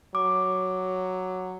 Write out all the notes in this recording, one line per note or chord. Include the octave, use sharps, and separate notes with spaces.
F#3 D6